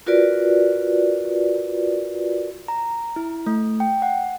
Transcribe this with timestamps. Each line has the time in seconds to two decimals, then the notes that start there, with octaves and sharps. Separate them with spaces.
0.06 F4 F#4 A#4 B4 D5
2.68 A#5
3.16 E4
3.46 A3
3.80 G5
4.02 F#5